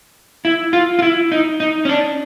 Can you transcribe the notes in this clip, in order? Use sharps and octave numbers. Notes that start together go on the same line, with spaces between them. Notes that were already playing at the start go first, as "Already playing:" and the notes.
E4
F4
F4
E4
D#4
D#4
C#4
D4